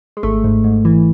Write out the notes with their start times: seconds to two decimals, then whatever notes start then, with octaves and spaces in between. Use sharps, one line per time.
0.17 G#3
0.23 G#1 A3
0.44 G#2
0.64 G#2
0.85 E3